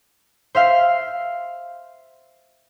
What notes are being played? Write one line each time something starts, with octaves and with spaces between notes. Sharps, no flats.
C5 E5 F5